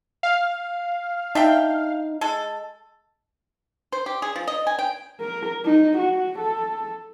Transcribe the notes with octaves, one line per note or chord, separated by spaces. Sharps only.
F5
D4 D#4 E5 G5
G#3 A4
C5
G4
G#4
F3
D#5
G#5
G5
A#4
D#4
F#4
A4